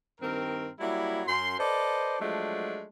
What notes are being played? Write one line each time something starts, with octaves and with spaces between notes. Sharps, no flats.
G2 D#3 C4 A#4
F#3 G3 A#3 E4
F#2 C6
A4 B4 C5 D5 D#5
F3 F#3 G#3 A3 D4